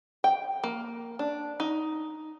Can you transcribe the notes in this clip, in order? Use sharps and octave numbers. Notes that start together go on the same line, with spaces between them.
G5
A#3
D4
D#4